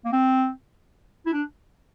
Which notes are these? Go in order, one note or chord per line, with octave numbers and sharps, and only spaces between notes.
A#3
C4
E4
D4